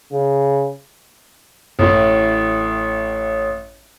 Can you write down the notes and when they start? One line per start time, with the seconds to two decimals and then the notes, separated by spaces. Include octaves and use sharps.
0.13 C#3
1.79 A1 A2